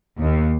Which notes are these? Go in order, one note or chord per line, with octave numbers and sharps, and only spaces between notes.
D#2